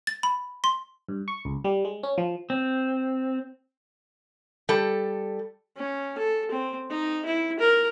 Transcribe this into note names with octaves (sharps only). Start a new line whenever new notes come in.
A6
B5
C6
G2
C#6
C#2
G3
G#3
C#4
F3
C4
G3 A4
C#4
A4
C4
D#4
E4
A#4